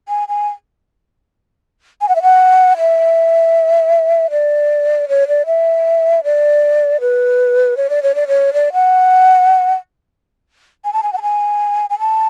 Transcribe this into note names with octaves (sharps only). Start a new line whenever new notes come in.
G#5
G#5
G#5
F#5
E5
F#5
E5
D5
C#5
D5
E5
D5
B4
C#5
D5
C#5
D5
C#5
D5
F#5
G#5
A5
G#5
F#5
A5
G#5
G#5
A5